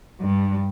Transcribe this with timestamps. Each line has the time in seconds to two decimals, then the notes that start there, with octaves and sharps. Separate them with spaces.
0.21 G2